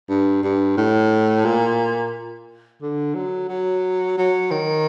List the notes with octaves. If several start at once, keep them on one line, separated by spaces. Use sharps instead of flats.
G2
G2
A2
A#2
D3
F#3
F#3
F#3
D#3